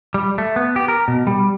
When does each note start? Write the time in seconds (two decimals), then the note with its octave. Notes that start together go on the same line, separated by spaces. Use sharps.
0.14 G3
0.38 A3
0.56 B3
0.76 G4
0.88 A#4
1.08 B2
1.27 G3